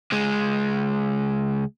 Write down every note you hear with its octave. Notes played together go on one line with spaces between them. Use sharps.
C#2 G#3